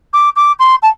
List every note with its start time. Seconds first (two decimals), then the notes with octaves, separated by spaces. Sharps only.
0.13 D6
0.36 D6
0.59 C6
0.83 A5